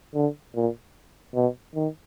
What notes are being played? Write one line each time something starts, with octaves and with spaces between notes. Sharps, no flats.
D3
A#2
B2
D#3